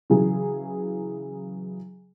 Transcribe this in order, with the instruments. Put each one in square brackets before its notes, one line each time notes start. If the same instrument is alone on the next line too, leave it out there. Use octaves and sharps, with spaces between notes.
[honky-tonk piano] C#3 E3 F#3 G#4